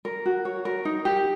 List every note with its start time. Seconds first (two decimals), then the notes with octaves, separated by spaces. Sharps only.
0.05 A#4
0.26 F#4
0.45 C#5
0.65 A#4
0.85 D#4
1.05 G4